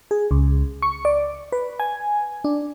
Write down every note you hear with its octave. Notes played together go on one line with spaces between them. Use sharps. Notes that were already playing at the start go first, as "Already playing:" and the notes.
G#4
C#2
C#6
D5
B4
G#5
D4